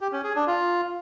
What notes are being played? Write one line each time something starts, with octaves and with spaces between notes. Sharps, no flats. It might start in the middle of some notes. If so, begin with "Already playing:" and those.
G4
C#4
G#4
D4
F4